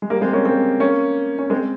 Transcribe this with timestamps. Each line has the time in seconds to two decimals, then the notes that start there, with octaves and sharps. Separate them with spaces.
0.02 G#3
0.10 G3 A#3
0.21 G#3 C4
0.33 A#3 C#4
0.46 G#3 C4
0.80 A#3 C#4
1.39 C#4
1.50 G#3 C4